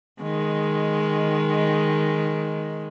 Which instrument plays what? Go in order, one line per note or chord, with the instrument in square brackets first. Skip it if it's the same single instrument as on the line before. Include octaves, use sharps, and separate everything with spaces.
[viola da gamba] D#3 G#3